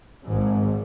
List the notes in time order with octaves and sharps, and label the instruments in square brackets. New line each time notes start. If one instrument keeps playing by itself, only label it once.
[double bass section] G#1 G#2